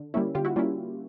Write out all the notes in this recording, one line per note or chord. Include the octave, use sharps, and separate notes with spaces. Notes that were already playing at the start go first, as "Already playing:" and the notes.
Already playing: D3
G3 A#3 C#4 E4
D3 F4 G4
E4 F#4
G3 A#3 C#4 E4 F4